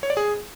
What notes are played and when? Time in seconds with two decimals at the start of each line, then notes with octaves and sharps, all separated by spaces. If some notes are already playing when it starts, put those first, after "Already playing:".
0.03 C#5
0.10 D5
0.17 G#4